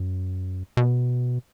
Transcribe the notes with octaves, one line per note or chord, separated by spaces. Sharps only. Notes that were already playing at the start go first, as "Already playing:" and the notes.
Already playing: F#2
B2